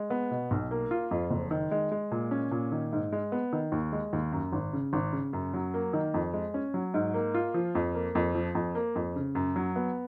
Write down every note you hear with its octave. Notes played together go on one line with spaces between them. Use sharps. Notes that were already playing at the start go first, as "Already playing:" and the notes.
Already playing: G#3
B3
B2
B1
A#3
F4
F2
F#1
D#3
G#3
G#3
A#2
C#4
A#2
D#3
G#2
G#3
B3
D#3
D#2
G#3
D#2
F#2
G#1
C#3
G#1
C#3
F#2
F#3
A#3
D#3
F2
G#3
C#4
F#3
G#2
A#3
F4
F3
F2
A#3
F2
F3
F2
A#3
F2
C#3
F#2
F#3
B3